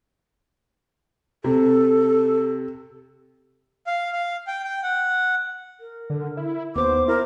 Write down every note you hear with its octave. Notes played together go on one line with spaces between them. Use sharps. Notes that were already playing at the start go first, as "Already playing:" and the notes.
C3 A4
F5
F5
G5
G5
F#5
A#4
D3
E4
D#2 B3 C5 D6
E4 A#4